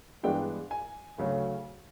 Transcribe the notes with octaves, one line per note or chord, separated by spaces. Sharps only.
G2 E3 G#3 B3 D4 G5
G#5
D2 C#3 F#3 A3 C#4